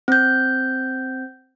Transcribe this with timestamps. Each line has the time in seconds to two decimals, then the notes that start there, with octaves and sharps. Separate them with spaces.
0.08 C4 G6